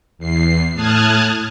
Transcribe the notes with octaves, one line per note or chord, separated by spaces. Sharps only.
E2 C7
A2 A5 D#6 F6 F#6 G#6